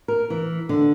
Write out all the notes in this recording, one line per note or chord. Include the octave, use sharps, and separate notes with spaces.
A#4
E3
D3